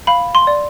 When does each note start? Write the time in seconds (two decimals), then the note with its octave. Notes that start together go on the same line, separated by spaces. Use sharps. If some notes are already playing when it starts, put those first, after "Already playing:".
0.07 F5 B5
0.35 C6
0.47 D5